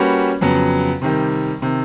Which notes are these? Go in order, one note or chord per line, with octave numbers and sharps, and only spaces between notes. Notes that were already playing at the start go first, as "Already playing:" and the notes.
Already playing: G3 A#3 C#4 F#4 B4
F2 C#3 F#3 B3
C3 D#3 G3
C3 D#3